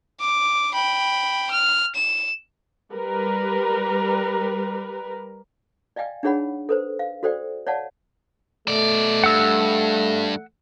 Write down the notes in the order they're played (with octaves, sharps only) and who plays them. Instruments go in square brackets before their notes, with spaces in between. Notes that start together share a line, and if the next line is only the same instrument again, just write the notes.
[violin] D6
G5 B5
F6
E7
[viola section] G3 A#4 B4
[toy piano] D5 D#5 F5 G5 G#5
D4 D#4 G#4 C#5 F#5 B5
A4 B4 C5
F5
F#4 A4 C5 D5 G5
C#5 D5 F5 F#5 A5
[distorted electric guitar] B2 D5 [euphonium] A3
[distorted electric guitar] G2 [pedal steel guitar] F#5 E6